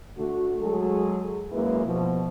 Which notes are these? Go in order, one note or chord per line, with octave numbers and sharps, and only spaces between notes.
D3 A3 F#4
F#3 G#3 G#4 A4
F#2 G#3 A#3 E4 B4
B2 F3